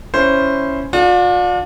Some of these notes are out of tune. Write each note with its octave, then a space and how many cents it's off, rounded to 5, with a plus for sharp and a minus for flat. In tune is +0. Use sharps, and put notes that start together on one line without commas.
C#4 +0 E4 +5 C5 +0
D4 +0 F4 +45